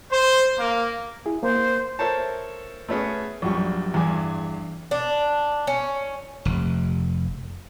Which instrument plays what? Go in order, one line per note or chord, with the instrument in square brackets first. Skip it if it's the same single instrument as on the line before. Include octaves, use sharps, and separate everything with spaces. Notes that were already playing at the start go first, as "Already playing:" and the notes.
[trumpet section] C5
A#3
[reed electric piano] E4 G#4
[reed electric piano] A#3 [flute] C5
[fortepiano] A4 A#4 C5 C#5 E5 A5
A3 B3 C#4 G#4
A#1 F#2 G3 C#6
E2 G2 G#4 G#5 D6
[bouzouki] D4
C#4
[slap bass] F1